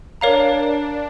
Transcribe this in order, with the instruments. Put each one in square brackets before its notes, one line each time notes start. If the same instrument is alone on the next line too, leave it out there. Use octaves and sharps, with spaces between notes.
[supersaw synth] D4 [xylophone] A#4 C#5 F5 A#5